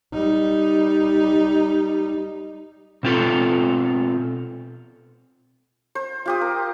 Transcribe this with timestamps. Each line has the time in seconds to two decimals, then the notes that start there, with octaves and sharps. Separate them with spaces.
0.13 G3 D#4
3.03 B2 C4 F4 A4
5.95 C5
6.26 F4 G4 D#6
6.41 A#4